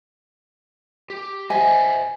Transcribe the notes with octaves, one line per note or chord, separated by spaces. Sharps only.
G4
C5 D#5 E5 G#5